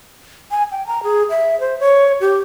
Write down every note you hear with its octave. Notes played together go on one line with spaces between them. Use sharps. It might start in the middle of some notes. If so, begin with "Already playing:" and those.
G#5
G5
A#5
G#4
E5
C5
C#5
G4